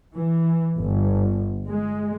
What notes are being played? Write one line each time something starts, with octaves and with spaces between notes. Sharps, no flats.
E3
G1
G#3